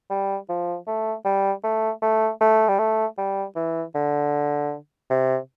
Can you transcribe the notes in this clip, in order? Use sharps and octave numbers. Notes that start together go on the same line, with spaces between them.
G3
F3
A3
G3
A3
A3
A3
G3
A3
G3
E3
D3
C3